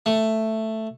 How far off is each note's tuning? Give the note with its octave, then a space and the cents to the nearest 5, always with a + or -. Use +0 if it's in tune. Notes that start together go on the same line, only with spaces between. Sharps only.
A3 +5